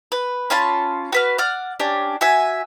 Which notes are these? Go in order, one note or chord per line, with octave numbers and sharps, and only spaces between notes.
B4
C#4 F4 A5 B5
F#4 B4 F6
D5 F#5 F6
C#4 D4 G4
F#4 E5 G#5